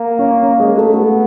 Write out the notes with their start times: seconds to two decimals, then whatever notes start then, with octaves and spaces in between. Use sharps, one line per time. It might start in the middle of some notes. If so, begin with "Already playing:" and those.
Already playing: A#3
0.19 C#4
0.43 C#4
0.60 G#3
0.78 A3
0.93 A3 B3